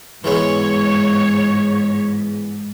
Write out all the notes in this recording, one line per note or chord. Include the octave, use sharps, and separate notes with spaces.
G#2 E3 G#3 B3 C#5